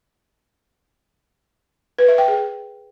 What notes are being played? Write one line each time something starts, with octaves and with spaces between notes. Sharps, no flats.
B4
E5
G5
G#4